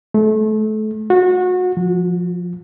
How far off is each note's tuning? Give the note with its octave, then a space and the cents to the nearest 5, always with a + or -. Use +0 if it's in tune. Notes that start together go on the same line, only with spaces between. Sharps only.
A3 -30
F#4 -25
F3 +10